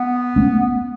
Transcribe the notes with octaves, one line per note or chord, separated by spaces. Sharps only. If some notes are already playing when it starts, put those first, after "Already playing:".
Already playing: B3
A3 C#4